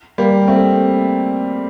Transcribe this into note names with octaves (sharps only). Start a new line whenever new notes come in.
G3 A#3
A3 C4